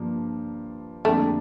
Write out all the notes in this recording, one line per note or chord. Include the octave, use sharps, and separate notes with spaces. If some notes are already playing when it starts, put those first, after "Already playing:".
Already playing: G2 F3 A#3 D4
F2 D3 G3 A3 A#3 D4